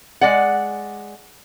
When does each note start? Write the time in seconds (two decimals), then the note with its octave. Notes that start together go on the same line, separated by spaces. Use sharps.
0.21 G#3 D5 F#5